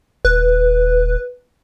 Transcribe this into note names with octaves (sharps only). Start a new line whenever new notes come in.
D#1 B4